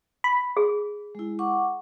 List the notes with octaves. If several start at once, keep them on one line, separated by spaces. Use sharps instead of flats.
B5
G#4
G#3 E4
F#5 C#6 D6